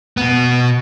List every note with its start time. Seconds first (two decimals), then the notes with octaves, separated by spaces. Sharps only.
0.17 B2 B3